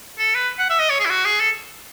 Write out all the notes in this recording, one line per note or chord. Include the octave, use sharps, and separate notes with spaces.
A4
B4
F#5
E5
D#5
C#5
G#4
E4
F#4
G#4
A4